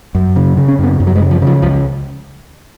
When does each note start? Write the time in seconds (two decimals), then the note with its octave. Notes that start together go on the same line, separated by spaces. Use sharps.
0.15 F#2
0.36 C#3
0.57 C#3
0.68 C#4
0.79 F#2 B3
1.00 F#2
1.07 F#3
1.16 G#3
1.21 C#3
1.31 F3
1.42 C#3 F3
1.62 C#2 F3